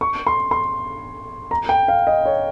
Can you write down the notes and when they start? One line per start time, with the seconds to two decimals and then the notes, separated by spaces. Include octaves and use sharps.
0.01 C#6
0.27 C6
0.51 C6
1.51 A#5
1.69 G5
1.88 F5
2.07 D#5
2.26 C#5